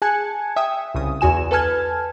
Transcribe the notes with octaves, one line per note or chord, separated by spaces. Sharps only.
G#4 G#5 A5 F#6 G#6 C#7
E5 G5 D#6
C2 C#3 D#6
E2 F#4 G#5 E7
A4 B4 G#5 A5 F6 G#6